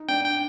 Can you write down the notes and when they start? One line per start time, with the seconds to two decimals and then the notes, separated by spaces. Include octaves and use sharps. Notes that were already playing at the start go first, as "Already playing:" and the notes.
Already playing: D#4
0.09 D4 G5
0.24 G5